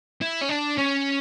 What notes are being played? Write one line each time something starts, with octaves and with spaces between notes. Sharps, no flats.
E4
C#4
D4
C#4